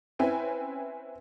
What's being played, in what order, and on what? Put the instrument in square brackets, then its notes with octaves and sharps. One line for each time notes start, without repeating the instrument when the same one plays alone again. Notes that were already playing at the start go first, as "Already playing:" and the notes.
[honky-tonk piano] C4 C#4 E4 B4 G5 G#5